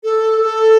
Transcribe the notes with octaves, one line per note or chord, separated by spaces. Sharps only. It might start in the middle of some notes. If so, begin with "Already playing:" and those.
A4
A4